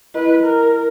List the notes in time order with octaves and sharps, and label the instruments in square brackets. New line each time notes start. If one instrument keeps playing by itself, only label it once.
[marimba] E4 D#5 [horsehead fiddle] B4
[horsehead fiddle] A#4